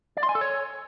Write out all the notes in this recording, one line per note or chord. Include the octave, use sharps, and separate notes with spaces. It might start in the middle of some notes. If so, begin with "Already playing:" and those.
D5
C6
G#5
A4
C#5